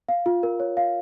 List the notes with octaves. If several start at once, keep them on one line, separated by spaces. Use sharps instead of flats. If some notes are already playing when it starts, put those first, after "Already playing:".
F5
F4
A#4
C#5
F5